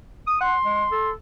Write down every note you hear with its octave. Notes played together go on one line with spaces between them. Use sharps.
D#6
F#5 C6
G#3
A4